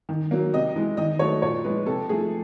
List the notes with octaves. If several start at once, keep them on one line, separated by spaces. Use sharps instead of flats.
D#3
F#3 A#3
C3 D#5
E3 G#3
D#3 D#5
F#3 A3 C#5
A#2 C#5
F3 G#3 B4
C3 A4
F3 A3 G#4